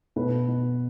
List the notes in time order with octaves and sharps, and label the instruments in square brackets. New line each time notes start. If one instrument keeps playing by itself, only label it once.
[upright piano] B2 B4
B2